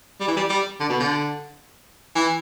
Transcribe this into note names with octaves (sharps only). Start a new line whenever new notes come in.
G3
E3
G3
G3
D3
B2
D3
E3